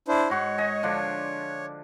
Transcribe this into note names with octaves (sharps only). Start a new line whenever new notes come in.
D4 E4 C5
G#2 F#4 C#5
D#5 G#5
D3 F3 D4